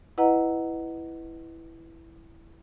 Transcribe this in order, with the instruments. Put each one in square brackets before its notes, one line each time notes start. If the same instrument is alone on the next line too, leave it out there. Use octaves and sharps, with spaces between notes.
[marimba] E4 B4 D#5 F#5 A#5